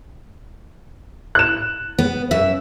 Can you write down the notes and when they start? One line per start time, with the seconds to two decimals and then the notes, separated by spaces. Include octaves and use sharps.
1.35 F#6 E7
1.99 B3
2.31 F#2 E5